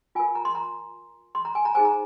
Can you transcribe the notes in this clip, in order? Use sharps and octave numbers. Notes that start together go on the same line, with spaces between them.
F4 A#4 G#5
A#5
C6
A#5
C6
A#5
G#5
A#5
D#4 G#4 C5 G#5
A#5